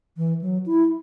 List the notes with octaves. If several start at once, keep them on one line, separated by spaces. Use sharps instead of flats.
E3
F#3
E4